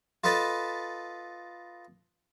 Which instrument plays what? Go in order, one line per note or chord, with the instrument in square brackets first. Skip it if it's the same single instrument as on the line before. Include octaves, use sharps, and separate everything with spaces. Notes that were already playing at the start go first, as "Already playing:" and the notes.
[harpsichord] F4 A4 B4 D#5 A5 B5